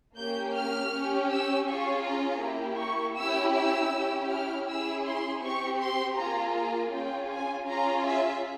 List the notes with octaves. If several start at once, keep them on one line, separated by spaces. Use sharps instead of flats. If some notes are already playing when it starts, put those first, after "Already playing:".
A#3 C#4 G4 G6
F6
C#4 G4
E6
C#4 F4 G#4 C#6
A#5
A#3 E4 G4
C#6
C#4 E4 G4 E6
E6
C#4 E4 G4
F6
C#4 E4 G#4 E6
C6
C4 G4 C#6
C6
A#3 F4 G#4 A#5
A#5
C#4 F4 G#4 G5
G#5
C#4 F4 G#4 A#5
E5